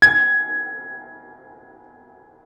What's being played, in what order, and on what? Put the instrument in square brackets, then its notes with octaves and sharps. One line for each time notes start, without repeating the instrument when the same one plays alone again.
[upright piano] G#6